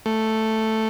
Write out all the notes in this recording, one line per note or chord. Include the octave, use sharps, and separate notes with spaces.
A3